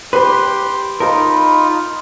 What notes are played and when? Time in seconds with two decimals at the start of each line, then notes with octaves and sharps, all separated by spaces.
0.13 G4 B4 C6
1.00 D#4 F4 A#4 B5